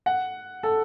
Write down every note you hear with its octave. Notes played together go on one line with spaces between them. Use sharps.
F#5
A4